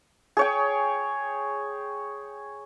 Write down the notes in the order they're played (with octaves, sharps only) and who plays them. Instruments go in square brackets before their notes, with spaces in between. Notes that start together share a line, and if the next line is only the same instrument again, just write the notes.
[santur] G#4 C#5 G5